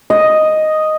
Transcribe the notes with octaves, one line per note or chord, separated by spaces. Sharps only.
D#5